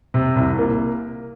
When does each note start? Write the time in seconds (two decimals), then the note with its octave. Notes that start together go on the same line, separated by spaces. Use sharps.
0.14 C3
0.36 C2
0.58 A#3